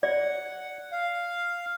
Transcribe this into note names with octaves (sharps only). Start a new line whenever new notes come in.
D5 F#5
F5